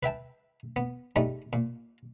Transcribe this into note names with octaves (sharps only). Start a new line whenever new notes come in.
B4 E5 G5 A5
B3
G#2 G3 A3 D#4
A#2